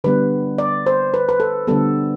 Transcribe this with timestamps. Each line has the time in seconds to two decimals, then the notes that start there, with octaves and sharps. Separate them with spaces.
0.04 D3 G3 B3 B4
0.58 D5
0.86 C5
1.14 B4
1.29 B4
1.40 A4
1.67 D3 G3 B3 A4